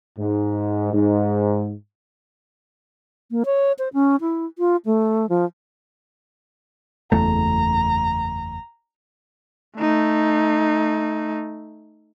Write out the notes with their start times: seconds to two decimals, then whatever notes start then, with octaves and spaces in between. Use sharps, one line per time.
0.17 G#2
0.93 G#2
3.31 A#3
3.45 C#5
3.78 C5
3.93 C#4
4.21 E4
4.58 F4
4.85 A3
5.29 F3
7.12 F#1 E2 A3 A#5
9.78 A3 D#4